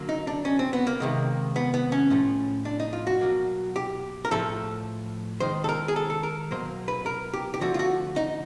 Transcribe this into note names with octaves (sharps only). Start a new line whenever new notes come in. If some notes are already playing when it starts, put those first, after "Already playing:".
Already playing: D3 F#3 A#3
D#4
D4
C#4
C4
B3
A#3
C3 D#3 G#3
B3
B3
C#4
A2 F3 A3
D4
D#4
F4
F#4
B2 F#3 A#3
G4
A#4
A2 F3 A3 A4
D#3 G#3 C5
A4
A#4
G#4
A4
A4
A#4
B2 F#3 A#3 C5
B4
A#4
G4
G4
D3 F3 A3 F#4
F4
F#4
D#4